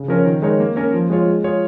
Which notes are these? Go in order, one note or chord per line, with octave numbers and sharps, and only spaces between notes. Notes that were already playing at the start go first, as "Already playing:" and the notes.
Already playing: C#3
F3 C#4 A#4 C#5
D#3
G#3 D#4 A#4 C#5
A#3
C#4 A#4 C#5
F3
G#3 F4 C#5
G#3
F4 G#4 C#5